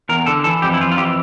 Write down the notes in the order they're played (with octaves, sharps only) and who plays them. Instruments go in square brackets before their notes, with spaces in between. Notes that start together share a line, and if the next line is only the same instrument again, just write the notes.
[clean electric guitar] E2 A#4
D3 A4
E3 A4
F2 G4
E4
F2 F4
F4
E3 G4